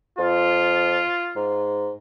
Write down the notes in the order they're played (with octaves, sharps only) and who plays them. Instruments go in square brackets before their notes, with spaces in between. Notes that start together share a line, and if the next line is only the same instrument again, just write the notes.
[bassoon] F2 [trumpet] F4
[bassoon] G#2